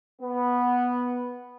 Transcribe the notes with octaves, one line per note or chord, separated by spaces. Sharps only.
B3